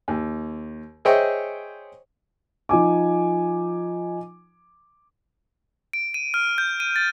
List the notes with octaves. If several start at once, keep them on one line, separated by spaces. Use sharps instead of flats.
D#2
G#4 C5 C#5 D#5 E5 G5
F3 D#4 G#5 D6
D7
D#7
F6
G6
D#7
A6